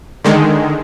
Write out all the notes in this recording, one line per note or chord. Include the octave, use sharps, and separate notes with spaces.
D3 D#3 G#3